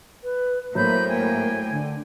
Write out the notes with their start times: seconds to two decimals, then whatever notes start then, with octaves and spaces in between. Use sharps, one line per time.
0.24 B4
0.75 A2 F#3 A#3 C5 B5 G6
1.08 A#3 G5 G#5
1.71 D3